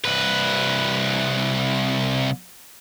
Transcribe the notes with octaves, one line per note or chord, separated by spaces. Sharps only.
C2 B4